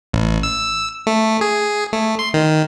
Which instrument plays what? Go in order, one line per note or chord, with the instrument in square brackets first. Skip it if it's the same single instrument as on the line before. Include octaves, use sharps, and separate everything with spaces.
[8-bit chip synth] A1
E6
A3
G#4
A3
C6
D#3